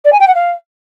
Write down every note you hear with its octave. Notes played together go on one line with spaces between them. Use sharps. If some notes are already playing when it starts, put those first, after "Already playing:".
D5
G#5
G5
F#5
F5